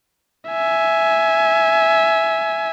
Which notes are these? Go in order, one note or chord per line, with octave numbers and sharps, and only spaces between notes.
E5 G#5